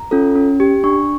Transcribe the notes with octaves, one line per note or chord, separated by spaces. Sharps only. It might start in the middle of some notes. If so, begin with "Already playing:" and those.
Already playing: A#5
C#4 F4 A4
C#4
G4
D4 C#6